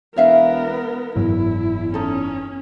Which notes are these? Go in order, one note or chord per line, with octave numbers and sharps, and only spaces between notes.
E1 B3 A#4 C#5 E5 F5
F#1 E2 G#2 F#3 E4
C#4 D#4 A4